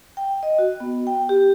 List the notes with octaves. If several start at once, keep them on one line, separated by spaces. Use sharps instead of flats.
G5
D#5
F#4
B3
G5
G4